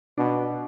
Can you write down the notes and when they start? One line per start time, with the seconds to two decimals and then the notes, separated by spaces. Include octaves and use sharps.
0.18 B2 D4